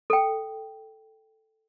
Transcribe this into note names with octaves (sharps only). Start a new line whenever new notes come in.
A4 G5